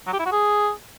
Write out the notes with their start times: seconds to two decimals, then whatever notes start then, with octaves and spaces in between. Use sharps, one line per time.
0.07 F#3
0.13 G4
0.19 E4
0.26 F#4
0.32 G#4